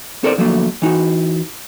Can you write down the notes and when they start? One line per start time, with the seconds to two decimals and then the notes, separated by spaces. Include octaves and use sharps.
0.23 C4 A4 A#4 C5 D5
0.38 D3 F3 F#3 A3 A#3
0.82 E3 D#4 F#4